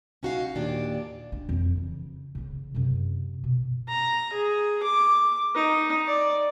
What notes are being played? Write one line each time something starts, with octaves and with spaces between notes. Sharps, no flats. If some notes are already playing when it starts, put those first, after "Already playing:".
C#4 D#4 F#4 D#5 F5
D#2 A#2 D#3 D4 G4
D4
F2 E3
C#3
C#3 B3
F#2 C3
B2
A#5
G#4
D6
D#4
D5